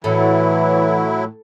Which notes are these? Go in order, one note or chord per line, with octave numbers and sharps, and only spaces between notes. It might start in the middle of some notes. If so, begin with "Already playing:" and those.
A2 E3 F#3 E4 A4 C#5